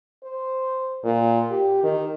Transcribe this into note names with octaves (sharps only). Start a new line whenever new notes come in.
C5
A#2
G4
D#3